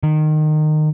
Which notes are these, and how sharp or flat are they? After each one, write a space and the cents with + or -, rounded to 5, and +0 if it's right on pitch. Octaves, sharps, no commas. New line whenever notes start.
D#3 -20